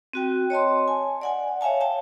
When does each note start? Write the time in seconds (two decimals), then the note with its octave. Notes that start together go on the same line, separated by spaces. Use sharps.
0.13 C4 F#4 G5
0.50 C#5 D#5 A5 C6
0.88 G#5
1.21 D5 F#5 G#5
1.61 C#5 E5 F5 G#5 A5
1.80 E5 G5 A5